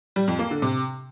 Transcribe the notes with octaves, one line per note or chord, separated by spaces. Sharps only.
G3
F2
A#3
D3
C3